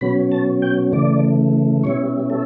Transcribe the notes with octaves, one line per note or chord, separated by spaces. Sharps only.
B2 F#3 C#4 B5
A5
G5
C#3 E3 A3 D5
B2 G3 C#4 E4 C#5
A4